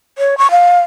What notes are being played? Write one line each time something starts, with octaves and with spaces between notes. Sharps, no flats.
C#5
C#6
F5